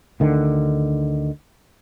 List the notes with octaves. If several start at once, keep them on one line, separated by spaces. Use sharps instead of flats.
D2 D3 D#3